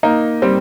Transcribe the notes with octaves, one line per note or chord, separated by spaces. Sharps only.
A#3 D#4
G3 C4